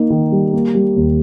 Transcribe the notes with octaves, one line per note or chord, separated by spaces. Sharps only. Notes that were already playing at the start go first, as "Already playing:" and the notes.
Already playing: A#3 D#4
D#3
G3
A#3
G3
D#2